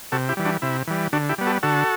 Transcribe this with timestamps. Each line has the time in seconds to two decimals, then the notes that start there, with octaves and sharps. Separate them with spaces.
0.12 C3 F#4 A4
0.29 E4 G4
0.37 E3 G3
0.45 D4 F#4
0.62 C3 E4
0.88 E3 G3
1.13 D3 D4 F#4
1.29 E4 G4
1.38 G3 B3
1.46 F#4 A4
1.63 D3 F#4 A4